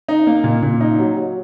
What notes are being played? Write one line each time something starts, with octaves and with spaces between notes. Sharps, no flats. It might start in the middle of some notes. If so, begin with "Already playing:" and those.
D#4
A#3
A#2
A#2
D#4
F#3
F#3